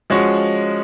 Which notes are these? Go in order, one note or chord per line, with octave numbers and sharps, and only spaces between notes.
F3 G#3 C#4 F#4